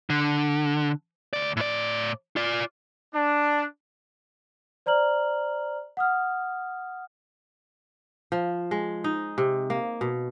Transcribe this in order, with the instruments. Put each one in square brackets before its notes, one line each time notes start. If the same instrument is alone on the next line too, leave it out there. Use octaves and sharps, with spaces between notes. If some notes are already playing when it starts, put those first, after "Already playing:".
[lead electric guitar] D3
D2 D5
A2 D5
F4 D5
[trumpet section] D4
[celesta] C5 D5 A#5 F6 F#7
F#5 D#6 F6
[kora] F3
G#3
D#4
C3
A#3
B2